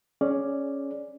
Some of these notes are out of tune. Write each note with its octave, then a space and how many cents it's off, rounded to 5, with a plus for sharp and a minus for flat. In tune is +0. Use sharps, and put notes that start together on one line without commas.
C#4 +0 G#4 +10 D5 +0